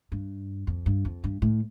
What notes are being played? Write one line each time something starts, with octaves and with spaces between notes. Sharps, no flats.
G2
F2
G2
F2
G2
A2